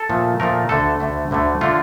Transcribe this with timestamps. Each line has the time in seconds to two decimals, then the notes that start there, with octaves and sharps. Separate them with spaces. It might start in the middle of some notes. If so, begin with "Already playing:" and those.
Already playing: A4
0.09 A#2 F3 A3
0.40 A#2 F3 A3 A#4
0.69 D2 D3 A3 A4
1.00 D2 D3 A3
1.31 D2 D3 A3
1.61 D3 A3 F4